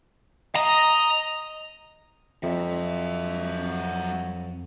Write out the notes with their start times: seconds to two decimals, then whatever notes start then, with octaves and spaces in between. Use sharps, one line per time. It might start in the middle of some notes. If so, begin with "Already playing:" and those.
0.56 D#5 A#5
2.43 F2 F#3 E5